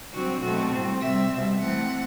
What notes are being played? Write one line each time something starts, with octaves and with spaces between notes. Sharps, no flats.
D3 F#3 C4 F#4
B2 F#3 A3 C4 F#4
A2 G3 C4
C3 G3 C4 E5
B2 G3 C4
E3 A3 C4 F#5